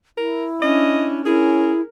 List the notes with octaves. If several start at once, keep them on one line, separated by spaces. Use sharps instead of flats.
E4 A#4
C#4 D4 D#5
C#4 E4 G#4 A#4